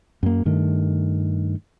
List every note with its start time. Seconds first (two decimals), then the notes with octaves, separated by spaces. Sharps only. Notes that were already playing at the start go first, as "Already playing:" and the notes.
0.23 F#2 A#3
0.45 G2 D#3 A3